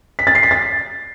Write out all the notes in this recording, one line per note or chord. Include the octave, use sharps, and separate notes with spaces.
B6
A6
C7
B6
A6